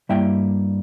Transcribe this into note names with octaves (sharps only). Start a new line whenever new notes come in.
G2 G3 A#3 E4 E5 G5